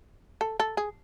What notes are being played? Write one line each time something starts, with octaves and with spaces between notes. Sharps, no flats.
A4
A4
G#4